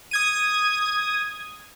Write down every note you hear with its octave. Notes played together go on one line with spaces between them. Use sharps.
D#6 G#6 D#7